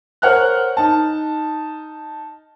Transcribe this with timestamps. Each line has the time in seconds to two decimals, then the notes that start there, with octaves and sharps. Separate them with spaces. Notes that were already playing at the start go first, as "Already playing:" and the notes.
0.22 A#4 C5 C#5 F#5 F6 F#6
0.77 D#4 A5